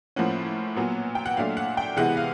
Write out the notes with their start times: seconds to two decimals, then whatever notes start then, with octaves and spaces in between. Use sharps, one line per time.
0.16 A2 F3 A#3 C#4 F#5
0.76 A#2 F#3 B3
1.15 G5
1.26 F#5
1.37 A#2 F#3 A3 D4 F5
1.57 F#5
1.77 G5
1.97 C3 E3 G#3 B3 F#5
2.17 F5